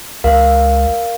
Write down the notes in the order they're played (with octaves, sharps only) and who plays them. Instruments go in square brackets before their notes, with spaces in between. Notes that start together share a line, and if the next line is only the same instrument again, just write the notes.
[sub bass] C#2 [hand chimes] A#4 F5